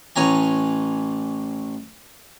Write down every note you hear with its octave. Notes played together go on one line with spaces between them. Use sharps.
A1 C#5 G#5 A#5